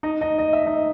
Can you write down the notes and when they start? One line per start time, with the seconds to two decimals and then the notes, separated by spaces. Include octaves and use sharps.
0.03 D#4 D#5
0.21 D#4 D#5
0.39 D#5
0.53 E5
0.66 D#4 D#5